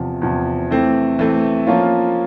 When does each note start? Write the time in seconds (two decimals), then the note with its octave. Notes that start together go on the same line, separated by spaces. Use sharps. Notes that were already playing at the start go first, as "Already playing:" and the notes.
Already playing: E2 C3 F3
0.22 E2 C3 F3
0.70 E3 A3 C4
1.19 E3 A3 C4
1.67 F3 A#3 C#4 F4